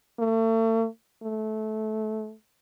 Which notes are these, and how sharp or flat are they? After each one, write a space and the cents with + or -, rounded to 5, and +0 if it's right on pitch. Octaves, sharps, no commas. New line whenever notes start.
A3 +40
A3 -20